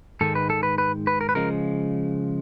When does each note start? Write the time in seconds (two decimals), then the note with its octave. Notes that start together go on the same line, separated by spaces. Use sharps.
0.21 G#2 D#3 G#3 A4
0.35 B4
0.50 A4
0.63 B4
0.78 B4
1.07 B4
1.21 A#4
1.29 B4
1.35 C#3 F3 G#3 A#4